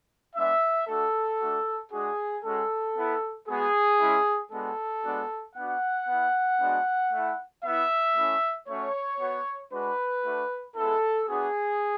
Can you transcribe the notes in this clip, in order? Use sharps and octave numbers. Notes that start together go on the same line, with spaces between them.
G#3 B3 D4 E5
A3 D4 F#4 A4
A3 D4 F#4
G#3 D4 F#4 G#4
G#3 C#4 F#4 A4
B3 E4
G#3 B3 F#4 G#4
G#3 C#4 E4
G#3 B3 D4 F#4 A4
G#3 B3 D4 F#4
B3 D4 F#4 F#5
B3 E4
G#3 B3 D4 F#4
A3 E4
B3 E4 E5
A3 C#4 E4
A3 C#4 F#4 C#5
B3 F#4
G#3 D4 F#4 B4
A3 D4 F#4
G#3 B3 E4 A4
B3 D4 F#4 G#4